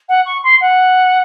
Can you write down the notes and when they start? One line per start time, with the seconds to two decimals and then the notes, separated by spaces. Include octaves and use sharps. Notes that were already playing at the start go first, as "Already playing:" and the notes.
0.09 F#5
0.26 C#6
0.43 C6
0.61 F#5